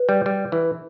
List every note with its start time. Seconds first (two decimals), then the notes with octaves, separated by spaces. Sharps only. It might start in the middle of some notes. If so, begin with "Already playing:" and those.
Already playing: B4
0.09 G3
0.26 G3
0.52 E3